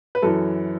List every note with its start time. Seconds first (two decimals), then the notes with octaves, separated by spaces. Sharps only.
0.15 B4
0.22 F#2 E3 A4